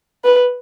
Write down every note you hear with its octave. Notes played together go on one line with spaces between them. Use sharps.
B4